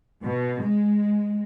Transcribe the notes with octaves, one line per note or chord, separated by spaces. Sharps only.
B2
G#3